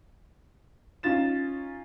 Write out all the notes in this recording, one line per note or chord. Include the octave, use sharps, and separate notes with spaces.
C#4 D#4 F4 A6 E7